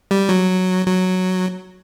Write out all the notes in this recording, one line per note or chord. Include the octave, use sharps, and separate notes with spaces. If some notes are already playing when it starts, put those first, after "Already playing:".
G3
F#3
F#3